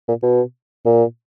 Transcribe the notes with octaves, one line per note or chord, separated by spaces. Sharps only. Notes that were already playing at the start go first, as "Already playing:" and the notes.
A#2
B2
A#2